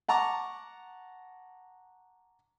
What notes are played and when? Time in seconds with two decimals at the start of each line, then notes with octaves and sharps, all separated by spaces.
0.08 F#5 A5 A#5 C#6 D6